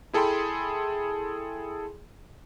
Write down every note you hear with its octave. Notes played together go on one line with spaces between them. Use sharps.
E4 G#4 A4 G5 B5 C6